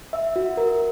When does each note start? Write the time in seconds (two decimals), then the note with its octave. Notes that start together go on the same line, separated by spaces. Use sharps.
0.13 E5
0.36 F#4
0.57 A#4